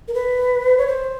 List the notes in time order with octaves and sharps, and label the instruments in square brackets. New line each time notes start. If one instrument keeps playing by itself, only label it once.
[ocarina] A#4
B4
C#5
C5